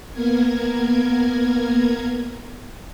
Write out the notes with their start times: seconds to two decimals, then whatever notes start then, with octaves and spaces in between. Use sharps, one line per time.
0.11 A#3 B3 A#4 G#6